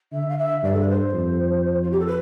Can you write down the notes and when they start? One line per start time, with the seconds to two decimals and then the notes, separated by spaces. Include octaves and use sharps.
0.12 D3 E5
0.29 F5
0.38 E5
0.64 G2 D5
0.73 A4
0.80 B4
0.89 C5
1.14 F2
1.82 F4
1.91 G4
1.99 A4
2.06 B4